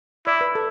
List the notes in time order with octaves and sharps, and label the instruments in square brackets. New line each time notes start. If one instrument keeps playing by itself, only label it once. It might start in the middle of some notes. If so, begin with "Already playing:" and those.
[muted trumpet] E4 [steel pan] D5
[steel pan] B4
A4